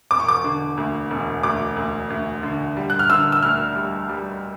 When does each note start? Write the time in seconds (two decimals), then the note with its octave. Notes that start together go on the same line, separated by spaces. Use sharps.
0.11 E1 D6
0.20 C#6
0.28 D6
0.44 D3
0.77 D2
1.10 E1
1.43 D2 D6
1.77 D2
2.10 D2
2.43 D3
2.77 G3
2.90 F#6
2.99 F6
3.10 D3 E6
3.32 E6
3.42 D2 F6
3.76 G3
4.09 G3